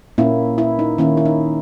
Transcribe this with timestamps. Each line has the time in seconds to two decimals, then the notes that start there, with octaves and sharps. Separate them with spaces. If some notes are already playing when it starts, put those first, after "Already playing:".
0.18 A#2 A#3 C#4 E4
0.58 E4
0.79 D#4
0.98 D#3 A#3 C#4 E4
1.17 E4
1.26 D#4